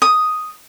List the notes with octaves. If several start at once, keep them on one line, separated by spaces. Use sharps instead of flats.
D#6